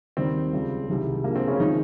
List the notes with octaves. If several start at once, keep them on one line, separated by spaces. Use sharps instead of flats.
D#2 D#3 G3 C4
C#2 C#3 G3
C2 C3 D#3 G#3
G2 F3 G#3 A#3
C4
C#3 C#4
D#3 F3 G#3 D#4